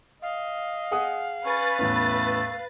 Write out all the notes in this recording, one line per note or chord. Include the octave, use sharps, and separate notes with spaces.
D#5 F5
G#4 F#5 D#6
C#4 B4 A6
E2 A2 A3 C#4